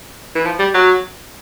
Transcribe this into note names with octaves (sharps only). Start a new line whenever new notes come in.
E3
F3
G3
F#3